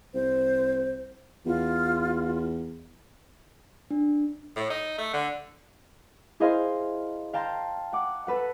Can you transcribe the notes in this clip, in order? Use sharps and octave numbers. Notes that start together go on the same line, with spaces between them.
C2 C5
E2 F4
D4
A2
D#4
A3
D3
E4 G#4 A#4 C5 D#5 F5
F5 G5 A5 A#5 C6 G6
F#5 D6
A4 B4 F#5